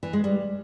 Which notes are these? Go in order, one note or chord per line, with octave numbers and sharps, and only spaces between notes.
E3
G#3
G3